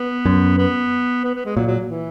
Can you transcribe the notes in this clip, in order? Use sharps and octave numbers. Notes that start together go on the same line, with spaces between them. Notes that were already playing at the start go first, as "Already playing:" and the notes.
Already playing: B3
F#2
B3
B3
B3
G#3
A#2 F#3
F#3
E3